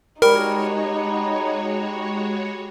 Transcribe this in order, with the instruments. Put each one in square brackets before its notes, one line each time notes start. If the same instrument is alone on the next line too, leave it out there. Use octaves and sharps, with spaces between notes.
[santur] G3 [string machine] G#3 F#4 C#5 [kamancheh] D#4 [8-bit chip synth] A#4